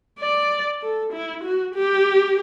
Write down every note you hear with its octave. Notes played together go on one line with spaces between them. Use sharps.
D5
A4
E4
F#4
G4